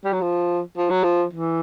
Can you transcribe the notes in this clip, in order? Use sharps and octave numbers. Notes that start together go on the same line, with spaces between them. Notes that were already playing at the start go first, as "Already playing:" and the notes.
G3
F#3
F3
F3
F#3
F3
E3